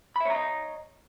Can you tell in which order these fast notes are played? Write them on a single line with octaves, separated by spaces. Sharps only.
B5 E5 C#5 A#5 D#5